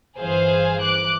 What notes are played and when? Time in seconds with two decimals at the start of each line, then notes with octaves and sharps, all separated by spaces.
0.17 G1 E3 G#4 C5 F5 G#5
0.80 E3 D6 F#6